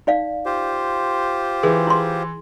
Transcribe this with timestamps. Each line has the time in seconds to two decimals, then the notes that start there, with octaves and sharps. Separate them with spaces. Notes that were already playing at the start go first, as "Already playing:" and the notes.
0.07 D#4 D5 F5
0.46 F4 G4 C5
1.63 E3 G#4
1.87 E4 C6